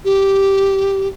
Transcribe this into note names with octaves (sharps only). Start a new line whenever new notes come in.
G4